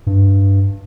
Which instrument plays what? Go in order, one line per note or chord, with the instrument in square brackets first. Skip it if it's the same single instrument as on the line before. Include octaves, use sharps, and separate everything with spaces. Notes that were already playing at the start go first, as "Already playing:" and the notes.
[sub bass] G2